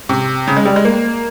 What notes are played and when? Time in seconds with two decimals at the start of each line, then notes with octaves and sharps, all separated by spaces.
0.09 C3
0.47 C#3
0.57 G#3
0.65 G3
0.76 G#3
0.85 A#3